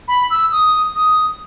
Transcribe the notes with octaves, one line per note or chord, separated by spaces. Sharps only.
B5
E6
D#6
D#6